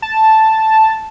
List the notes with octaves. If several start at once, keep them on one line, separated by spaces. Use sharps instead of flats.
A5